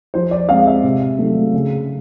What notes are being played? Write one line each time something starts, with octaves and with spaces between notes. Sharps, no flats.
F3 C5
D5
G#3 C4 F5
E5
C3
D#3 F#3 A3
C#3